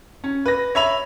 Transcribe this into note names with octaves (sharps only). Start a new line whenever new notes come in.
C#4
B4 A#6
C#5 E5 B5 F7